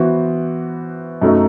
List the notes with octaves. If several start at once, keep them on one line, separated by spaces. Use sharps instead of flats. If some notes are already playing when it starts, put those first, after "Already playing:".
Already playing: E3 B3 F#4 C5
F#2 F#3 A3 D#4